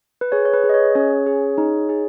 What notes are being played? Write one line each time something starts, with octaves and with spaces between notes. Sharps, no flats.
B4
G#4 C#5
C#5
B4
G#4
D#5
C#5
C#4 C#5
G#4
D#4
G#4